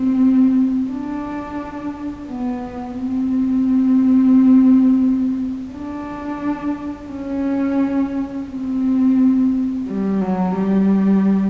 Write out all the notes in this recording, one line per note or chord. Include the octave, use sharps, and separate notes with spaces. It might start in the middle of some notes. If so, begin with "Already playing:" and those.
Already playing: C4
D4
B3
C4
D4
C#4
C4
G3
F#3
G3